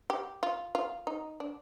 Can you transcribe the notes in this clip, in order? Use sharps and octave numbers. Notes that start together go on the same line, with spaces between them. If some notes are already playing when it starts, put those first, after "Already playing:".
G4
F4
F4
D#4
D4